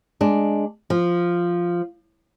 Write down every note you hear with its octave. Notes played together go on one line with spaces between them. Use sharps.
G#3 D4
F3